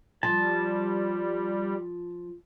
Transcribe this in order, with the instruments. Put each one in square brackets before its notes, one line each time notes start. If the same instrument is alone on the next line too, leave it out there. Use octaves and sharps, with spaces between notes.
[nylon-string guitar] F3 [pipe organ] G3 [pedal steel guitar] A5